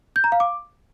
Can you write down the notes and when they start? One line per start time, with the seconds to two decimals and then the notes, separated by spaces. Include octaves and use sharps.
0.16 G6
0.24 A#5
0.32 F5
0.40 D6